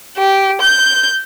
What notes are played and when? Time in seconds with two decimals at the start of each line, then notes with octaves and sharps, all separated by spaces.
0.17 G4
0.61 G6